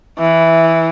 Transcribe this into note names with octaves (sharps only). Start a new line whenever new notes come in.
E3